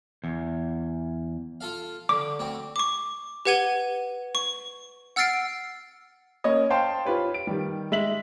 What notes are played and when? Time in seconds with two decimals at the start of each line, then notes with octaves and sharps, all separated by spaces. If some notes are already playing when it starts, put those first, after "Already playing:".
0.24 E2
1.61 F4 A4 F5
2.09 D3 D6
2.39 D2 C4
2.76 C#6 D6
3.45 G4 B4 F#5 G#6 D#7 G7
4.35 C#6
5.16 F#5 E6 F6 A6 C7 D7
6.44 A#3 C#4 C#5 D#5
6.70 C5 F5 G5 A5 C6
7.05 F4 G4 B4 C#5
7.34 D7
7.47 D#3 G3
7.92 G#3 E5 B6 F#7